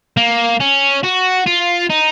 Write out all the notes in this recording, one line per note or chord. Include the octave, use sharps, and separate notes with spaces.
A#3
C#4
F#4
F4
D#4